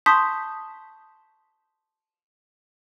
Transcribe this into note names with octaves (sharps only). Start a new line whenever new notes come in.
A5 C6 C#6 D#6 G6 B6